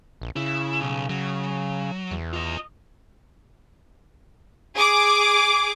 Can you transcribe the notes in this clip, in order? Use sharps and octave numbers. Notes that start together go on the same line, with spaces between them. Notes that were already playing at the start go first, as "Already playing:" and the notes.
A#1
C#3 E4
B1
C#3 F#3
E2
F4 D#5
G#4 D6